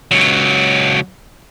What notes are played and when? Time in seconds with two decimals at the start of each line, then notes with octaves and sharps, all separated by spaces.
0.11 C#2 F#3